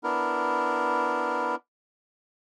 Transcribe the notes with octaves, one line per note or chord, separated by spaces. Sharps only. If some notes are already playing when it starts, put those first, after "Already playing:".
B3 D4 E4 A#4